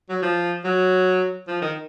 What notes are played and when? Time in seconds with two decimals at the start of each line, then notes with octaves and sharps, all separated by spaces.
0.09 F#3
0.22 F3
0.64 F#3
1.48 F3
1.62 D#3